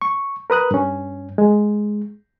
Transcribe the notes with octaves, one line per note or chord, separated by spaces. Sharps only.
C#6
A#4 B4 D#6 F#6
G2 C#4
G#3